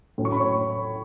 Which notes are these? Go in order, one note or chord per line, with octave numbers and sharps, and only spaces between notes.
A2 F#3 C#4
C#6
B5
C#5 C#6